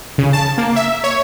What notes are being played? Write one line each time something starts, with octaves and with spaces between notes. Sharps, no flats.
C#3
A5
A#3
E5
C#5